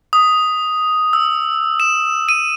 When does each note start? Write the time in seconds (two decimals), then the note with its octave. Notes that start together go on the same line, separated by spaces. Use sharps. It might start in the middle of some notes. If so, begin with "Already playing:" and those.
0.13 D#6
1.13 E6
1.80 E7
2.29 D#7